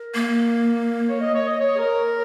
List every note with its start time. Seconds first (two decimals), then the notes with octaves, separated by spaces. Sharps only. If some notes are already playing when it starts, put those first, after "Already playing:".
Already playing: A#4
0.15 A#3
1.08 C#5
1.21 D#5
1.34 C#5
1.47 D#5
1.60 C#5
1.73 G#4
1.79 A#4